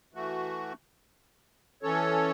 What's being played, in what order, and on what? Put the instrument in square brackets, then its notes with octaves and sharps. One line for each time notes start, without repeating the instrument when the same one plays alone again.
[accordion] E3 A3 F#4
E3 C#4 A4 C#5